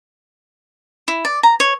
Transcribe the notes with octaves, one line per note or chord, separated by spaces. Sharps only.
E4
D5
A#5
C#5